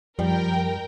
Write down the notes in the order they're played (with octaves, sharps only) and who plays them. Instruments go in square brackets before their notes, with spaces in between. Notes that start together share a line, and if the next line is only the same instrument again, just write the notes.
[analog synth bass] F#2 [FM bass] F3 [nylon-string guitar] G3 [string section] A#4 G5